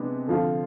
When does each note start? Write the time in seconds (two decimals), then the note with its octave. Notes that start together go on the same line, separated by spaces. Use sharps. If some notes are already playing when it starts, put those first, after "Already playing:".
Already playing: C3 G#3 B3 D4
0.27 D3 F3 C4 F4